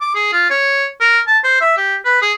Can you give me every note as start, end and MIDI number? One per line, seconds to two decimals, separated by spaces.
0.01 0.10 86
0.15 0.30 68
0.33 0.49 65
0.51 0.87 73
1.01 1.20 70
1.27 1.38 81
1.44 1.60 72
1.61 1.73 76
1.77 1.96 67
2.05 2.17 71
2.22 2.33 68